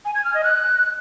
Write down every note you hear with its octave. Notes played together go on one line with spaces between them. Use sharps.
G#5
G#6
F6
D#5
F#6